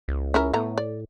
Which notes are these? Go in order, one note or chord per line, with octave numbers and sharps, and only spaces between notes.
C#2
C#4 E4 A#4
A2 A3 B3 A#5
D5